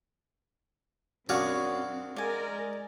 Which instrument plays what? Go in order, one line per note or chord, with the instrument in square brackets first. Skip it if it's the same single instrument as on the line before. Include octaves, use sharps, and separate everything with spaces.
[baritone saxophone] F#2 [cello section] C4 [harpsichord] D4 G#4 F5 [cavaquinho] F#4 C#6
[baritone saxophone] G#3 [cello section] A#4 [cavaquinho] D5 G#5